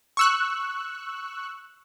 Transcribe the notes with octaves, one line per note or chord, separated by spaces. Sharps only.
C#6 E6 F#6